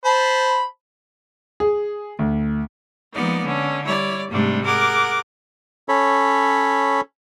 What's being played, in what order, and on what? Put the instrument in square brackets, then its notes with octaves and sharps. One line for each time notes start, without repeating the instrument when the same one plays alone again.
[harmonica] C5 A5 B5
[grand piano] G#4
D2
[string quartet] F3 G#3 A#3 B3 D#4 D5
D3 C#4
G3 E4 C#5 D5
G#2 C3 G3 A3 D4
G#4 A#4 F#5 D6
[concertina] C#4 A4 C#5 B5